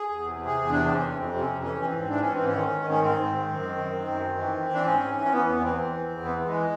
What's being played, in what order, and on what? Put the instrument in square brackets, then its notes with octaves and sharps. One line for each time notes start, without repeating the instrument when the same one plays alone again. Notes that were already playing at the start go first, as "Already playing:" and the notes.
Already playing: [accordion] G#4
E2
C3
C3
G#4
E2
C3 D4
E3 C4
C#4
F2
F2 C4
C3
C#4
F2
E3 C#4
E3
C4
G#2
E3 D4
E3 C#4
C4
G#2
C#4
D#3
D#3
G#2
C#4
G#2 C4
G#2
D#3
F#2
D#3
F#2
D#3
F#2
D#3
E3
E3
E3 D4
G#2 C#4
G#2
E3
C4
E3 B3
E2 B3
E3 C4
E3
E2
E2
E3 B3
E3
G#3